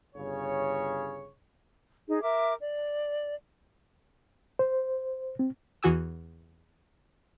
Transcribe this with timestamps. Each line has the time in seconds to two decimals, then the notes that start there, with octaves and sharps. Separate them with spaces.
0.15 G1 C#3 C#5
2.07 D#4 G#4
2.22 A#4 E5 D6
2.60 D5
4.59 C5
5.39 C4
5.83 E2 E3 F#4 G#5 D#6 E6